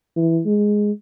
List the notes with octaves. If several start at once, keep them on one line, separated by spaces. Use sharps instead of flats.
E3
G#3